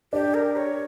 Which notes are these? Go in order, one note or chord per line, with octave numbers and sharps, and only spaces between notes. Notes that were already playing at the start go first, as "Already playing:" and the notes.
D4 G4
A#4
C#5